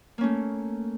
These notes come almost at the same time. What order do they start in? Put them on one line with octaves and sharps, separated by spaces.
A#3 C#4 A3